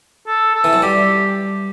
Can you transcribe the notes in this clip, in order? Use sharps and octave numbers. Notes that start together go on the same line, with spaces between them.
A4
A4
E3
F#3
G3 G4